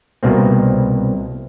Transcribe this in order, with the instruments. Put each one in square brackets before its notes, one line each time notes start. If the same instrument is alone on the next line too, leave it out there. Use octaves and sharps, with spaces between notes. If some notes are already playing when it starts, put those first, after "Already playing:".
[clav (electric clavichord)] C2 B2 A#3 C4